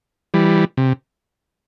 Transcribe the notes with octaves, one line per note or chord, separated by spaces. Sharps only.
E3 G3
C3